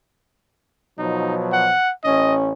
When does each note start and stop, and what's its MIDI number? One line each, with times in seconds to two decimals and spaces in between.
0.99 1.73 47
0.99 1.73 53
0.99 1.73 54
0.99 1.35 63
1.53 1.92 78
2.04 2.52 33
2.04 2.52 61
2.04 2.35 75